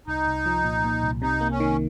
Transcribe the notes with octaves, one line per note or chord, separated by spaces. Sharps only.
C2 D#4
C2
F3
A#2
A#2
C2
C3 D#4
A#3
C#4
D#3